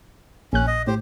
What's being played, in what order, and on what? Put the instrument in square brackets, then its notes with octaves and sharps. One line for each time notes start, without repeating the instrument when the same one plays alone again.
[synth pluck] A#1 F#6 [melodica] C#4
[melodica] D#5
[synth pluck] A2 [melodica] G4 C5